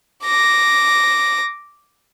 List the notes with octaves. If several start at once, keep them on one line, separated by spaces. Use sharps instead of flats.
D6 A#6